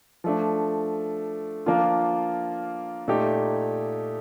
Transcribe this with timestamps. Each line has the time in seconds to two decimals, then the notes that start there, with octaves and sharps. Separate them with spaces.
0.24 F3 A3 D4
1.66 F3 A#3 D4 F4
3.08 A#2 A3 D#4 G4